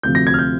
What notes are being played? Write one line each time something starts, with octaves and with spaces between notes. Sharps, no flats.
D2 C3 F3 G6
A#6
G#6
F6
G6